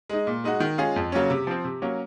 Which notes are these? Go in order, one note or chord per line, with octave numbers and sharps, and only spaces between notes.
G#3 D#4
A#2
G#3 D#4 F#4
D#3
G#3 C#4 F4 G#4
F2
C#3 F#3 A#3 C#4
C3
F3 C4
C3
F#3 A#3 C#4